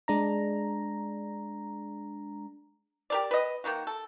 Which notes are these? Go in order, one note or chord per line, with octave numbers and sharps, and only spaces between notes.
G#3 D4 A#5
G4 A#4 D5
B4 D#5
D#3 A#3 D#4 F#4
A4